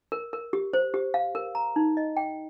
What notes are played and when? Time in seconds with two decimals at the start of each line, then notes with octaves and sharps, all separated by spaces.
0.12 A#4
0.33 A#4
0.53 G4
0.73 C5
0.94 G4
1.14 F5
1.35 A#4
1.55 A#5
1.76 D#4
1.97 D#5
2.17 G5